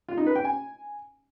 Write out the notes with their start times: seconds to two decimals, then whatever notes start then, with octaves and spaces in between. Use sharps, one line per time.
0.09 F4
0.18 D#4
0.27 B4
0.36 G5
0.45 G#5